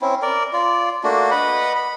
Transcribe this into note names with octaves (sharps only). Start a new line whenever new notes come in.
C4 C#4 E4
A#4 D5
F4 D5
A3 A#3 D4 F#4
B4 D#5 F#5 B5
B5